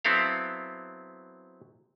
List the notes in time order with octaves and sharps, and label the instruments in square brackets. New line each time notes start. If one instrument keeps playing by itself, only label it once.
[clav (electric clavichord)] F#3 B3 C4 E4 A4 F5